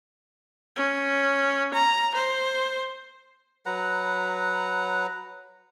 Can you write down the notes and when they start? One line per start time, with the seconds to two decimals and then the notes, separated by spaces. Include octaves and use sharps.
0.76 C#4
1.73 A#5
2.15 C5
3.66 F#3 B4 F#5 A#5